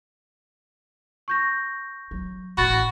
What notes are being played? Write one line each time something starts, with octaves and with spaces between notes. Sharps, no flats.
C#6 G6 A#6
F#3
A1 A2 F#4 B5 A6